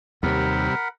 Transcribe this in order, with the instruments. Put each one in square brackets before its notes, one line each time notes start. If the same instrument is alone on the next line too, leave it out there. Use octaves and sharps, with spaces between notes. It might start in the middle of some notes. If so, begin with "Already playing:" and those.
[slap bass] D#2 [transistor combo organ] C3 G3 [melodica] A#4 F#5 B5